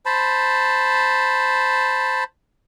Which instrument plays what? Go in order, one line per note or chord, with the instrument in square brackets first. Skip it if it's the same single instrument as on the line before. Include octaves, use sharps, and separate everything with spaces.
[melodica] C5 A5 B5